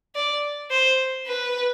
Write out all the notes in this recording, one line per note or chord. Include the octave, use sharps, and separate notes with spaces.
D5
C5
B4